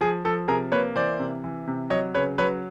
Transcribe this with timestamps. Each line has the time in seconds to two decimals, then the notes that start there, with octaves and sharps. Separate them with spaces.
0.01 F3 G#4
0.25 F3 A4
0.48 C3 G#4 A#4
0.72 A#3 B4 C#5
0.96 E3 C5 D5
1.19 C3
1.44 E3
1.67 C3
1.90 F#3 C#5 D#5
2.14 C#3 B4 C#5
2.38 F#3 B4 C#5